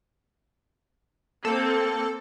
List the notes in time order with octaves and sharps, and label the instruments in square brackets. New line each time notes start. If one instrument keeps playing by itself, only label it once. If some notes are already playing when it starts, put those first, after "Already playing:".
[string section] A#3 C4 [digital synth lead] A4